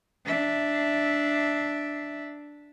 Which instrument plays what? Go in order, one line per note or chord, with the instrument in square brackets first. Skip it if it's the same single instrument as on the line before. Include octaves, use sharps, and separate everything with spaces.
[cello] D4 E5